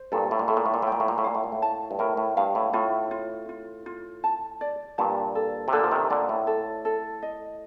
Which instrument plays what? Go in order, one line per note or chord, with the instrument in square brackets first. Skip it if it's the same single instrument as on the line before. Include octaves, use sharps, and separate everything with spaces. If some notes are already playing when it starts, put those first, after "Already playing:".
Already playing: [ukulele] C5
[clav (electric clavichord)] G2 A#2 [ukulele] A4
[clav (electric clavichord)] A2
A#2
[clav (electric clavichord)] A2 [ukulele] A4
[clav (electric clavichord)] A#2
A2
A#2
A2
[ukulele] G5
[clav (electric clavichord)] A#2
A2
A#2
A2
[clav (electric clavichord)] A#2 [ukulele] F5
[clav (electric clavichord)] A2
A#2
A2
[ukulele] A5
[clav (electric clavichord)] G2
[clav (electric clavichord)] A2 [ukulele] A#4
[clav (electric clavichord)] A2
[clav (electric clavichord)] G2 [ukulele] F5
[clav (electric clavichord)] A2
[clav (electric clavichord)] A2 [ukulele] F4
[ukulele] F4
F4
F4
A5
D5
[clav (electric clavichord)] G2 A#2 [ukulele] A5
[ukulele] A4
[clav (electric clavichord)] C3
[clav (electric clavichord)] A#2 D3 [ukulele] A4
[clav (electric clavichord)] F3
C3 D#3
[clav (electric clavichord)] A#2 D3 [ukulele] D5
[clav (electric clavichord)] A2
[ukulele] A4
A4
D#5